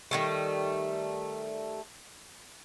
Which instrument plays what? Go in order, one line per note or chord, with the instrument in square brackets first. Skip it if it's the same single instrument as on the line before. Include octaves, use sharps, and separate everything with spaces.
[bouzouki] D#3 G3 A3